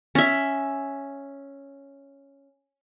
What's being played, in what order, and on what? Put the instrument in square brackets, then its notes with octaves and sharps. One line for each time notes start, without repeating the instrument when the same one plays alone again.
[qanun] C#4 E5